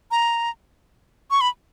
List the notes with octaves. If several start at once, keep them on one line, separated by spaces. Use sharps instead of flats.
A#5
C#6
B5